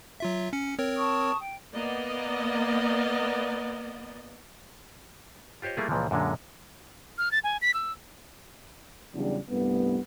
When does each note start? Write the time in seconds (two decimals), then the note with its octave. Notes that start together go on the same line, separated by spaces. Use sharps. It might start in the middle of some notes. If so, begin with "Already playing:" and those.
0.20 F#3 F4 E5
0.53 C#4 C#7
0.79 C4 A#4 C#5
0.97 A5 C#6 D#6
1.40 G5
1.74 A#3 B3 D5 D#5
5.62 F4 G4 C5 C#5 D#5
5.77 G3 A3 A#3 E4 F4 G#4
5.89 C#2 A#2 E3 F3
6.11 F#2 A#2 D3 G#3
7.18 F6
7.31 A6
7.44 G#5
7.61 B6
7.74 E6
9.14 E2 C#3 F#3 G3 D4
9.49 C2 G2 A3 B3